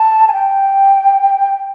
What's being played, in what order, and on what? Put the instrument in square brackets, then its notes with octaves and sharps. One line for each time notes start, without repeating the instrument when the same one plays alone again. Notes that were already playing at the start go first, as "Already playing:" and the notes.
Already playing: [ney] A5
G#5
G5